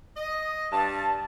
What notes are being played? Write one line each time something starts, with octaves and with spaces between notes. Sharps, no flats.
D#5
G2 A5